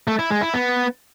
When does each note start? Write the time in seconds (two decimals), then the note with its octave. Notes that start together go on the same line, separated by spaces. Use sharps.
0.07 A3
0.19 E4
0.31 G#3
0.42 E4
0.54 B3